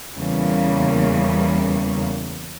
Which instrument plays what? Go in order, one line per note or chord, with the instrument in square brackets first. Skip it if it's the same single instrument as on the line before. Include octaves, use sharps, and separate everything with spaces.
[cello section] E2 C#3 E3 G3 A#3